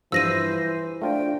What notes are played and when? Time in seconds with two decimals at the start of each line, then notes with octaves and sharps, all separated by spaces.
0.12 G2 E3 F3 C5 E6 A#6 D#7
1.02 A3 D4 F4 C5 G5